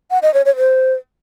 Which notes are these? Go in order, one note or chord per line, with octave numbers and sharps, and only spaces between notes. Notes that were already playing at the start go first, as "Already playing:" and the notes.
F#5
D#5
C#5
C#5
C5